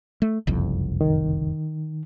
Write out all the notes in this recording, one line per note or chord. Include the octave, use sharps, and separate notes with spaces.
A3
F#1 C2 F2
D#3